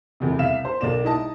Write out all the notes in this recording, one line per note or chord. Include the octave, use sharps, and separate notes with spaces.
F1 E2 C3
C2 E5 F5 E7
C5
B1 A#3 D5 E7
D#4 E4 D#5 A5